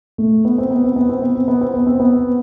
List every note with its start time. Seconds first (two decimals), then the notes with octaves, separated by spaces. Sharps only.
0.18 A3
0.45 B3
0.58 C4
0.71 B3
0.84 C4
0.96 B3
1.09 C4
1.22 B3
1.35 C4
1.48 B3
1.61 C4
1.74 B3
1.87 C4
2.00 B3